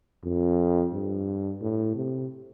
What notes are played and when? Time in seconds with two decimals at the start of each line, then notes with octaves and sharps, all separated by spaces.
0.24 F2
0.93 G2
1.61 A2
1.95 C3